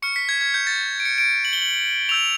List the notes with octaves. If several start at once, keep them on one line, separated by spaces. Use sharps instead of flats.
C#6 F6 C#7
B6
G#6
G#6
G6
A6
D7
C#7
D7
F#7
G7
F#7
C#6 E6 G6 F7